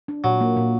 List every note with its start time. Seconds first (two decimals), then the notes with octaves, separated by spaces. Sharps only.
0.08 D4
0.24 A#2 F#3
0.41 A#3
0.57 A#2